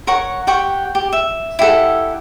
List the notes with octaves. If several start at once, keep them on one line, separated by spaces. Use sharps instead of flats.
A#4 C#5 F#5 C#6
G4 F#5 G5 C#6
G4
E5
E4 G4 A4 F#5